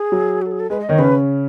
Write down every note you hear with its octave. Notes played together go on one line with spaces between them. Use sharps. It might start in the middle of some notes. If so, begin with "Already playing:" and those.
Already playing: G#4
F#3
F#4
A4
G#4
A4
G#3 B4
D#5
D#3 D#4 C#5
C#3 C#4 B4